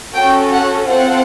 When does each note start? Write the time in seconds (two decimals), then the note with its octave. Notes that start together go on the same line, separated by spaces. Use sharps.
0.14 C#4 F#4 A4 G5
0.51 F#5
0.88 C4 F4 A4 F#5